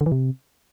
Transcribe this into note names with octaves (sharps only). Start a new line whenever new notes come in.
D3
E3
C3